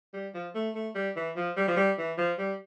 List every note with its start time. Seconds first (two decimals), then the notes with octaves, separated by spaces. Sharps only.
0.13 G3
0.34 F3
0.55 A3
0.75 A3
0.95 G3
1.16 E3
1.36 F3
1.57 G3
1.68 F3
1.76 G3
1.98 E3
2.18 F3
2.38 G3